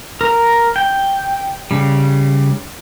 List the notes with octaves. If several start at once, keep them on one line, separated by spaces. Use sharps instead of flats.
A#4 A#5
G5
C#3 G3